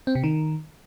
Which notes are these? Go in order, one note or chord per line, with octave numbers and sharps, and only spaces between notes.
C4
C3
D#3